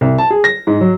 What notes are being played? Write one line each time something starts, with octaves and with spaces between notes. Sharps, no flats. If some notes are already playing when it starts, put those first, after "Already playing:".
C2
A5
G#4
A#6
G#2
F#3